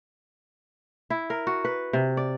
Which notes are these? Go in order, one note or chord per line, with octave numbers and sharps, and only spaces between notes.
E4
A#4
F#4
B4
C3
D5